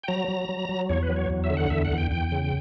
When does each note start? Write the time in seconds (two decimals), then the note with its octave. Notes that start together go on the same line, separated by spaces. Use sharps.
0.03 G5
0.08 F#3 A#5
0.28 F#3
0.49 F#3
0.69 F#3
0.89 E2 C#5
1.03 B4
1.10 F#3
1.16 C#5
1.30 E2
1.44 E5
1.50 D3
1.57 F#5
1.70 E2 E5
1.85 F#5
1.91 E2
1.98 G5
2.11 E2 G5
2.32 C#3